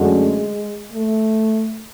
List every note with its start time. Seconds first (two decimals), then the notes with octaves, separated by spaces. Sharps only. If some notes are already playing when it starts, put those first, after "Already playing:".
Already playing: F#2 D3 G#3 A3 C#4 F#4
0.92 A3